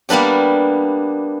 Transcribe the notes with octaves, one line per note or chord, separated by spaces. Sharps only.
G3 A#3 B3 D4 G4